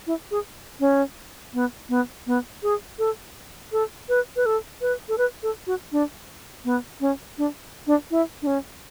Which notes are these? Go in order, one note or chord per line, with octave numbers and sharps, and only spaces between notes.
E4
G#4
C#4
B3
B3
B3
G#4
A4
A4
B4
B4
A4
B4
A4
B4
A4
F#4
D4
B3
C#4
D4
D4
E4
D4
C#4